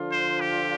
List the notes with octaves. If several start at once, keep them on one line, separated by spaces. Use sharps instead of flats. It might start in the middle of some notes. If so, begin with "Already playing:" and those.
Already playing: D3 F3 D4 F4
C5
G4